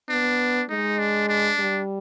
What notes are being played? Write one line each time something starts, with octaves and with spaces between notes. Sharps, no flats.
B3 D4
G#3 D#4
D4
D4
G3